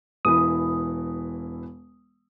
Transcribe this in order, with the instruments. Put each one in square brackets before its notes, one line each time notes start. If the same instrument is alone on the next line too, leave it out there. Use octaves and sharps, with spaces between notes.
[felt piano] E1 E3 E4 [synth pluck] D#6